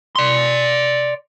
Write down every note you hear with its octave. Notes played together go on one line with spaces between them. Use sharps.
D5 C6